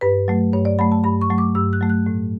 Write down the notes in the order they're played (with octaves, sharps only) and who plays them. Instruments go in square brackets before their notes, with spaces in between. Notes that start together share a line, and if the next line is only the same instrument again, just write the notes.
[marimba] G2 B4
F#3 A3
G2 C#5
D5
F#3 A3 B5
A5
G2 B5
C#6
F#3 A3
D6
G2 E6
F#6
F#3 A3
F#6
A2